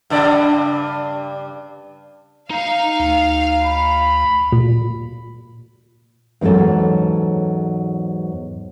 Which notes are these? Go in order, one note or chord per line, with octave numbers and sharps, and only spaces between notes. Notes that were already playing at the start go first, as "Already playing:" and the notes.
G2 C#3 D5
D#4 F5 A#5
D2
B5
A#2
E2 G#2 F#3 C#4 A4